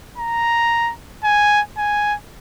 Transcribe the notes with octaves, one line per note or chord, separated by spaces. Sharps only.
A#5
G#5
G#5